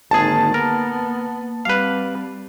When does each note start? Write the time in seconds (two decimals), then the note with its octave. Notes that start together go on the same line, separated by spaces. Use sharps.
0.11 G#1 D3 D#3 A#3 G#4 A5
0.54 B3 A#4
1.65 G3 C4 B4 F5 F#5 D6